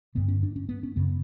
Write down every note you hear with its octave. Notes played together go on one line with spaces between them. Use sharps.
G2 D3 B3
C#4
D4
C#4
B3
C#4
F#2 C#3 B3